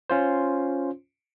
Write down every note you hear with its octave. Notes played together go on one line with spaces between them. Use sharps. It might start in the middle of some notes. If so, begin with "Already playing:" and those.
C#4 F4 C5